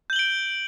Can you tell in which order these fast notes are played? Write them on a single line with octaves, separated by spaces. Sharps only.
G6 F#7 G7 D7